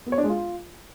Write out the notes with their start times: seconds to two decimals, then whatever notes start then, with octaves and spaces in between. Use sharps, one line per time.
0.06 B3
0.12 C#5
0.18 D4
0.24 G#3
0.29 F4